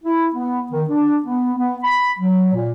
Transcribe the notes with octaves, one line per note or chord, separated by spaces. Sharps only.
E4
B3
D#3
D4
B3
B3
B5
F#3
A#2